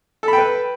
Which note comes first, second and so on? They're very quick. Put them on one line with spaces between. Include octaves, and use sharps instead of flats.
A4 B5 G5 B4